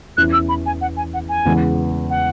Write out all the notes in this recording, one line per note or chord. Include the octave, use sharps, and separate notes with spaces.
E2 E3 C#4 F#6
E6
B5
G#5
F#5
G#5
F#5
G#5
E2 C#3 G#3 B3
F#5